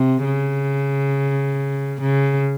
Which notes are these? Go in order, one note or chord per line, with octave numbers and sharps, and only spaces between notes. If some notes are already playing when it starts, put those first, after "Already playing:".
Already playing: C3
C#3
C#3